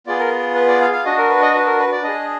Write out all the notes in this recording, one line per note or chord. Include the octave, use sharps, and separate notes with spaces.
B3 F4 G#4 D5
A#4
B4
D5
F5
F5
D4 F#4 D#5
A#4
B4
D#5
B4
A#4
B4
D5
D4 G#4 D#5